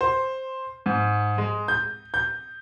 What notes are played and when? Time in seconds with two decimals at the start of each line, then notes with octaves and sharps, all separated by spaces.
0.01 C5
0.86 G#2
1.38 G#3
1.68 G6
2.14 G6